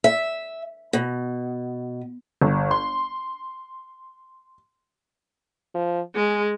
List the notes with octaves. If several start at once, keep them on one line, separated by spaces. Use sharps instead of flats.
E5
B2
G1
C6
F3
G#3 G#4